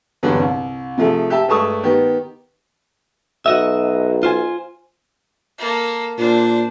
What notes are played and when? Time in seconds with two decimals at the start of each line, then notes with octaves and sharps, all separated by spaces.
0.23 E2 G2 D3 F#3 G3
0.40 C2
0.98 C3 F3 A3 G#4 A4
1.30 G4 E5 A5
1.48 G2 G#3 A3 A5 C#6 D#6
1.83 D#3 B3 G4
3.46 B1 F#4 D#5 E5
4.23 F4 C5 G#5
5.59 A#3 A4
6.18 A#2 D4 C5